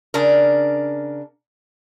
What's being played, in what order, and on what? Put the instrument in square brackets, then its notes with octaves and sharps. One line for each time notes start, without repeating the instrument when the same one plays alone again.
[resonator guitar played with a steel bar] C#3 D4 A#4